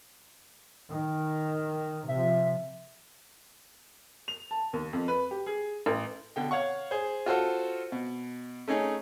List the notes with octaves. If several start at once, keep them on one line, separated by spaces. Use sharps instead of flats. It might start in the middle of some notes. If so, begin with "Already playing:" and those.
D#3
C3 F3 E5
F7
A5
D#2
F2
B4
G4
G#4
A1
B2 D3 G5
C#5 F5 F#5 C#6
G#4 C5
F4 F#4 A4 C5
B2
A3 C#4 D#4 G#4